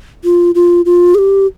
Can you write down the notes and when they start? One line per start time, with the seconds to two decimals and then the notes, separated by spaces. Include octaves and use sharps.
0.24 F4
0.55 F4
0.85 F4
1.15 G#4
1.19 G4